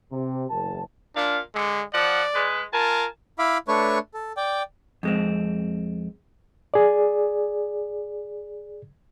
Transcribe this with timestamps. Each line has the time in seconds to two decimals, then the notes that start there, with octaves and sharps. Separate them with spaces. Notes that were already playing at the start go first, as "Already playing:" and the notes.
0.12 C3
0.51 F#1 E2 A#4 A5
1.16 A#2 D4 F5
1.55 D3 G#3
1.94 F3 D5 F#5
2.35 G#3 B4
2.73 F4 A#4 G#5 A5
3.39 E4 E5 F5 B5 D6
3.68 A3 D4 B4 C#5 C#6
4.14 A4
4.37 D5 G5
5.03 F2 G#3 C4
6.74 G#4 D5